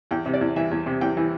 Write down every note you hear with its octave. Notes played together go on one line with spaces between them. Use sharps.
E2 G5
C3
D5
E2
E3 E5
E2
C3
E2 G5
E3